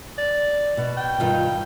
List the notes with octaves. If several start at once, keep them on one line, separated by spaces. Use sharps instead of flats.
D5
B2
G5
G2 D#3 F4